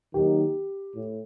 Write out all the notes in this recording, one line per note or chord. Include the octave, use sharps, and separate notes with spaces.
D#3 F#3 A#3 D#4 G4
A2